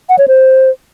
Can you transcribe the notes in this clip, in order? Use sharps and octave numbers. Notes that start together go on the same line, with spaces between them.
F#5
C#5
C5